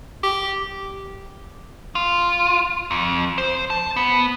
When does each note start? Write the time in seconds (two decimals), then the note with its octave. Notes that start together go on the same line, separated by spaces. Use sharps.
0.23 G4
1.95 F4
2.91 F2
3.38 C5
3.70 A5
3.96 B3